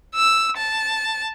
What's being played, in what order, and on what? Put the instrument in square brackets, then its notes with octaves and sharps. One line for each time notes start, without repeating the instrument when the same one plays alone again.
[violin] E6
A5